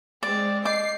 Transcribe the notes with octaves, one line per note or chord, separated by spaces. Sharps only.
G#3 C4 D5
D#5 D6 G6 A6 C7